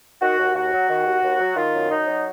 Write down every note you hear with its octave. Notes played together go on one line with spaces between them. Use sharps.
D#3 F#4
D#2
D#2 F#4
F#3
D#3
D#2
D#2
F#3
D#3 F4
F#2
F#2 D#4
F#3